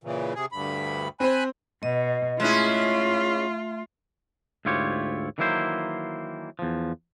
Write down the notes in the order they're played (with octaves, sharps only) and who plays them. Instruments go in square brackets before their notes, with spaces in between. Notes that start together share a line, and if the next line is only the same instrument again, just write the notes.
[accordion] A#2 C#3 E3
C3 G#4
D2 G2 B5
[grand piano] C4 C5 [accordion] G#5 B5 F#6
[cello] B2 [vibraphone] D#5
[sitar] G#3 C#4 E4 [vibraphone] A3 E5 C6 [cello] F4
[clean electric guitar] D2 G#2 E4 F4 G4 C#5
D#3 E3 F#3 A#3 E4 C5
E2 F3